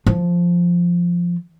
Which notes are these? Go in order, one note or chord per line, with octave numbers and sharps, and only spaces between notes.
F3